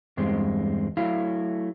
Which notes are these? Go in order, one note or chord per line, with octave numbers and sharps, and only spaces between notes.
E2 G2 G#3 C4
F#3 A3 E4 F5